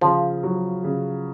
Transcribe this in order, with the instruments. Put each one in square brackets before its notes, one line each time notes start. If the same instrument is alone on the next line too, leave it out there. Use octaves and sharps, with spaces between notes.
[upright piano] C#3 [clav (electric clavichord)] F3
[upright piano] F#3
C#3